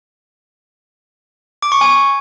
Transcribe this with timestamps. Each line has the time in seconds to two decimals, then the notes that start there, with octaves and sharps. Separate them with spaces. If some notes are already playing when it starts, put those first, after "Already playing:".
1.62 D6
1.72 C#6
1.81 G#5